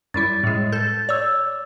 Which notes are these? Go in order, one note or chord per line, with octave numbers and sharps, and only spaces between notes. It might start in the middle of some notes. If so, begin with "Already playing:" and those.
F#2 G3 E4 A6
A2 G#3
A4 G6 A6
C#5 D5 E6